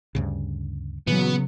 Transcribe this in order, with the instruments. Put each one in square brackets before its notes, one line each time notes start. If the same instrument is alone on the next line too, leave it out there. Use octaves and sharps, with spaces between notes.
[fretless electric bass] D2 G2 C#3
[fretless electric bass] A#2 E3 [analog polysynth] C#3 F#3 [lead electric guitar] B3